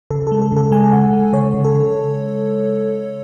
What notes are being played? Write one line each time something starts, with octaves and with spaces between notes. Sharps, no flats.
C#3 A4
G#3 A4
A4
C#3 A4
G#3 G#5
C#3 F#5
G#3
C#3 C#5
C#3
A4
C#3